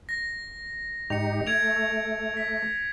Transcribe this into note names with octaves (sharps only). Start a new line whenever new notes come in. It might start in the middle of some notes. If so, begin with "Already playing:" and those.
A#6
G#2 D#4 G4 C#7 F7
A3 G#6 D7 F7
B6